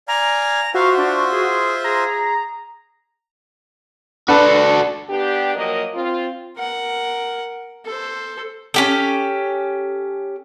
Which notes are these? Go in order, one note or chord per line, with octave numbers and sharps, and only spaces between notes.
D5 F5 G#5 A#5
F4 F#4 C5 E5 F5
D4
G#4
G#4 A#5
D4 F#4 A4 B4
B3 D4 G4
F3 F#3 A#3 A#4 D#5
C4 F4
A#4 F#5
A4 C5
C#4 G4 A4